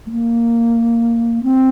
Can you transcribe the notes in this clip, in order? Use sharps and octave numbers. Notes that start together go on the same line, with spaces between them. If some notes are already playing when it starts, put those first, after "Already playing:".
A3
A#3
C4